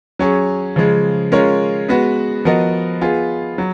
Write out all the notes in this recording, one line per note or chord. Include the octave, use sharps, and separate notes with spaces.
F#3 C#4 G#4
C#3 F3 G#3
G#3 C#4 F4 A#4 C#5
G#3 B3 F#4 B4
F3 B3 F#4 A#4 D#5
B3 F4 G#4
F#3